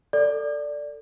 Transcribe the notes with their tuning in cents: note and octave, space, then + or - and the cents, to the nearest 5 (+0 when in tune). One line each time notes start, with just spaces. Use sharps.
A4 +25 D5 +0